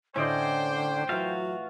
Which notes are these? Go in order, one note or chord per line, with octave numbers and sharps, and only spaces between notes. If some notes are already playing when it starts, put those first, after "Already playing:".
A2 D3 C#4 C5 D5 D#5 G5
E3 F#3 A3 F4 F#4 F5